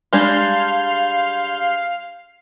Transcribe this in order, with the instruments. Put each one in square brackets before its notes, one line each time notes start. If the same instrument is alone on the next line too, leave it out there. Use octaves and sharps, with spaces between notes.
[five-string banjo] G3 G#3 D4 [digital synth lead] F5 [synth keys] C6 G6 G#6